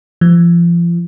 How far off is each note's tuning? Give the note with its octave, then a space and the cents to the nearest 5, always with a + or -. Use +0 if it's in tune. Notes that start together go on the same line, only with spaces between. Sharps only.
F3 -35